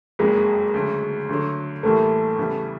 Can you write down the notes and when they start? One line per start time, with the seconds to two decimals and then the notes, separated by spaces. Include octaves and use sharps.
0.19 F#1 F2 C#3 F#3 G#3 A#3
0.74 D2 C#3 F#3
1.29 D2 D3 F#3
1.83 A2 E3 G3 A3 A#3
2.38 E2 C#3 E3 G3